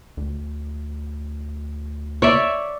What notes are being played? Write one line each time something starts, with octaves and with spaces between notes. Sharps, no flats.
D2
C#5 D5 E5